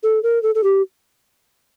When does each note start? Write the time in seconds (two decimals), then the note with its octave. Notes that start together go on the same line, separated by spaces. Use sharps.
0.03 A4
0.23 A#4
0.43 A4
0.55 A4
0.64 G4